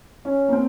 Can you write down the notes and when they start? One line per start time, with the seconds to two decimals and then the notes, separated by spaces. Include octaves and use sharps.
0.25 C#4
0.49 A#3
0.52 C4